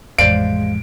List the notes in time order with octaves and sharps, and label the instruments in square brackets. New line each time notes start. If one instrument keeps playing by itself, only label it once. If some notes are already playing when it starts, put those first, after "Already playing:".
[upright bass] A1 F2 [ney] G#3 [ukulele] C5 D5 F5 [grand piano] D7